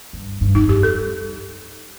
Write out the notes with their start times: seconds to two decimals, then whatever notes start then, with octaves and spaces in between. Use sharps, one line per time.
0.13 G2
0.41 G2
0.55 F2 D#4
0.69 G2 G4
0.83 A4